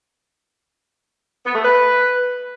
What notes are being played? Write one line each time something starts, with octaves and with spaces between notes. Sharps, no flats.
B3
A3
B4